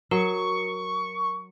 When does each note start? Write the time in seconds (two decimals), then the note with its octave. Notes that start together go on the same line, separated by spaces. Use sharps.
0.11 F#3 A#4 C#6